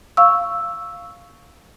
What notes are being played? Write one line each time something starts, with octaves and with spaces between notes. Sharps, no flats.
F5 C#6 E6